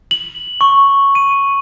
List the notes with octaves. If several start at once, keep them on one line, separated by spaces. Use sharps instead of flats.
F#7
C#6
D#7